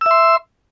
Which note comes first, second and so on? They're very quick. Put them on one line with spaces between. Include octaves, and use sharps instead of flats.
E6 E5 C6